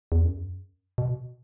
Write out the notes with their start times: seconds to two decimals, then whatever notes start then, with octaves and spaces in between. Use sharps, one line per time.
0.12 E2
0.24 F#2
0.98 B2